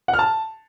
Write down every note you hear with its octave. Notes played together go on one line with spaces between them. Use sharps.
F#5
F6
A5